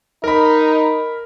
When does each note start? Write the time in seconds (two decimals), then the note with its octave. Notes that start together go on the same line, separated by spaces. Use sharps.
0.24 D#4 A#4 B5